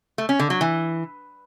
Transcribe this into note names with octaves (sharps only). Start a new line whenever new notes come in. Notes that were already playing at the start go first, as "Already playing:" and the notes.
A3
C#4
D3
F#3
E3